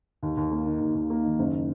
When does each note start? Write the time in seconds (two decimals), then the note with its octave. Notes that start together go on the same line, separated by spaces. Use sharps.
0.23 D#2
0.37 D#2
0.51 A#3
0.66 D#3
0.80 D#2
0.95 D#2
1.10 A#3
1.23 D#3
1.39 F#1